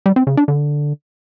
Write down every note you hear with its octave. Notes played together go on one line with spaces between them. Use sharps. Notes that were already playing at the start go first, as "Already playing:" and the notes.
G3
C4
C#3
D4
D3